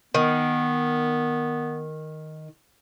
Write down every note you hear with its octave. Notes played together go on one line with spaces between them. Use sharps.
D#3 B3